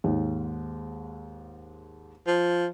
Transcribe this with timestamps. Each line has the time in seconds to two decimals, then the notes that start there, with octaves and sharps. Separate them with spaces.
0.04 D#2 G#2
2.27 F3